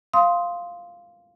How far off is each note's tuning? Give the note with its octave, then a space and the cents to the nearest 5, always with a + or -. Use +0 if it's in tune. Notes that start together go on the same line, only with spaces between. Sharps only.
F5 +0 C6 +0 D#6 +15